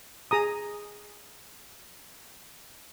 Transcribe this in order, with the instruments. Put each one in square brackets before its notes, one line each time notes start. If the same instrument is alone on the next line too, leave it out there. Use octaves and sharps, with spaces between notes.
[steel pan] G#4 A#5 D#6